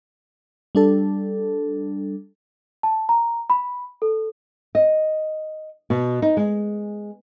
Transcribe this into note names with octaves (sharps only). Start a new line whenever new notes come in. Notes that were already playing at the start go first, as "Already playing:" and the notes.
G3 D4 A4
A5
A#5
B5
A4
D#5
B2
D#4
G#3